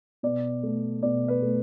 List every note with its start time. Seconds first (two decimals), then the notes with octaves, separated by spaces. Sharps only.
0.23 B2 D5
0.63 A3
1.03 B2 D5
1.28 B4
1.42 A3